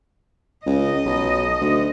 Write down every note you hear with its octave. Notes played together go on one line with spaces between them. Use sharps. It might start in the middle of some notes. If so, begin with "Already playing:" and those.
C#2 D#5
B1
D2